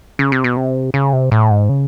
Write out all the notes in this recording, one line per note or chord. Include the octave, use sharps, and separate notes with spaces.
C#3
C3
B2
C3
C#3
C3
A2
G#2
C#3